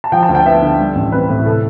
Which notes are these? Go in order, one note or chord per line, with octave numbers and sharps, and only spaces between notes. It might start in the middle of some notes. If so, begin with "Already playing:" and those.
A5
F3 G5
A5
D2
G5
B3 E5
D3
G3
A1
C4 B4
A2
C3 A4